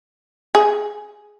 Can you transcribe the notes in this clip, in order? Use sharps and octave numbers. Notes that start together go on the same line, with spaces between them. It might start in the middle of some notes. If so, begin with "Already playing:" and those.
G#4